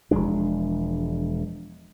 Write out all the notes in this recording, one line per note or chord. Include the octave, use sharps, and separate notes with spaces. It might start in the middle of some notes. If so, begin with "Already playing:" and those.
E1 F3 G#3 D4